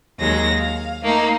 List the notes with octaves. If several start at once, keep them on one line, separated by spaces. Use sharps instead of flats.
D#2 F#3 G#3 A#6
F5
A3 A#3 D#4